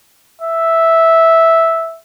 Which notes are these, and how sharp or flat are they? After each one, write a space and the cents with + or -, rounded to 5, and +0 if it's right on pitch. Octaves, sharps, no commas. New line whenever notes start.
E5 -5